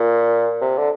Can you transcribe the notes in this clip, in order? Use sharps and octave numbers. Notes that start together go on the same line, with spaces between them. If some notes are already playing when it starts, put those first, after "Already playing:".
Already playing: A#2
C3
D3